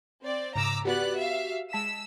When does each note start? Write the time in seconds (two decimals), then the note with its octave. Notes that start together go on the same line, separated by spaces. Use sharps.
0.23 C4 D5
0.56 G#2 C#3 A#5 D6 E6
0.85 B3 F#4 G4 D5 F#6
1.18 E5 F5
1.73 G#3 A5 E6 B6